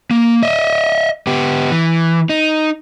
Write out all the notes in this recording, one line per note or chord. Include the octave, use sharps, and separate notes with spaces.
A#3
D#5 E5
B3 G4
E3
D#4